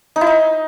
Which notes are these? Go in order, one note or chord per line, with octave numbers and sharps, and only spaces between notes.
D#4
E4
D#4